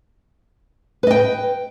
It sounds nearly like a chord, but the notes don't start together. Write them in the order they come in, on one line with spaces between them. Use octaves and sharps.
B4 D#5 G5